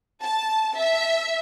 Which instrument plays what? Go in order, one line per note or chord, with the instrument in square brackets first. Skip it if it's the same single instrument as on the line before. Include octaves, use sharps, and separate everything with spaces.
[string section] A5
E5